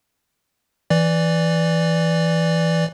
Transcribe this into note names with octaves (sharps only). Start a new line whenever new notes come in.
E3 D5